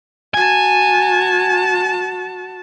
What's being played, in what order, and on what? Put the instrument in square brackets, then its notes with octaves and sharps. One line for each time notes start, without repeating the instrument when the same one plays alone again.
[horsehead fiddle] F#4 A5 [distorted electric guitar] G#5